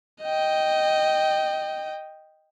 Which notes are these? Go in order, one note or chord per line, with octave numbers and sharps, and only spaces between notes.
D#5 G5